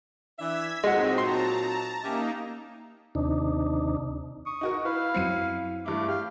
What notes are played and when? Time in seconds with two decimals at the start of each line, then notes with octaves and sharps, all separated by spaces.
0.39 E3 D4 E5 E6 G#6 B6
0.84 A#2 F#3 G#3 C4 D#4 F#4 F#5
1.18 A5 A#5 C6
2.03 A#3 C#4 D#4 G4 E5
3.15 D#2 C3 D4 D#4
4.46 C#6 D#6
4.61 D#4 F#4 A#4
4.85 E4 B4 F5
5.14 F#2 F#3 C4 C7 C#7 D#7
5.86 G2 A3 E4 D6
6.09 G4 F5